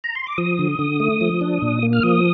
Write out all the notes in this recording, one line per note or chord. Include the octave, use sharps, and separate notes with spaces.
A#5
C6
D6
F3 D#6
D3
D3
A3
F3
D4
A#2
A#3
F6
F3 D#6